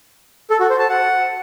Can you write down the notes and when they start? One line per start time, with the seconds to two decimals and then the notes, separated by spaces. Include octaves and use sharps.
0.50 A4
0.60 F#4
0.70 C5
0.80 A5
0.89 F#5